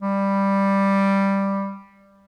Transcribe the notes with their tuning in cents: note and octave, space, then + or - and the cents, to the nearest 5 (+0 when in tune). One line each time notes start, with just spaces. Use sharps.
G3 +5